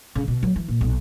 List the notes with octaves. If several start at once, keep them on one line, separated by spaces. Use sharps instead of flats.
C#3
B2
F#3
E3
A#2
B1